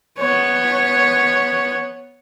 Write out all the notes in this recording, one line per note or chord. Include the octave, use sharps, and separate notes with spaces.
B3 C#5